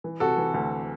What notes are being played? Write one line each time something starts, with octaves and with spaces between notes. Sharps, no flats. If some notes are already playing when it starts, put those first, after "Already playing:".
E3
C3 F#4 A4
E3
D2